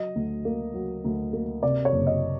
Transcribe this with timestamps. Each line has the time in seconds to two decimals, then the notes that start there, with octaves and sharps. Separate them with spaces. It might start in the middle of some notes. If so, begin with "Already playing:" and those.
Already playing: F#3 D#5
0.16 D2
0.45 A#3
0.74 F#3
1.05 D2
1.33 A#3
1.63 C3 D5
1.85 C#5
1.92 F#1
2.07 D#5